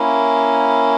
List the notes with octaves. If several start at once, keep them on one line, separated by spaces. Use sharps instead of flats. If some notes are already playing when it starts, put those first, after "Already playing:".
Already playing: A#3 C#4 E4